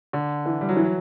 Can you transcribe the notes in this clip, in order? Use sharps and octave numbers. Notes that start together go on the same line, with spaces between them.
D3
E3
G3
F#3
E3
F#3